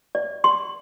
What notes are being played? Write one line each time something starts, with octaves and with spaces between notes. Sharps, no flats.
D5
C6